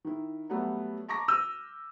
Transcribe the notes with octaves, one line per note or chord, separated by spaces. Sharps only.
D#3 E4
F#3 G3 A3 B3
A5 A#5 C#6 D6 A#6
E6 F6 G6 D#7